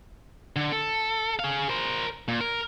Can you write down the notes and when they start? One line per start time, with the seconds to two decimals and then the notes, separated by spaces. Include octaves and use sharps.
0.56 D3
0.72 A4
1.39 G#4 F5
1.69 A#4 C5
2.28 A#2
2.41 A#4